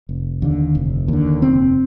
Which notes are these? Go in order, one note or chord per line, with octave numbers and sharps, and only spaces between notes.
F1
D#2 D3
F1
D#2 D3
F1 C4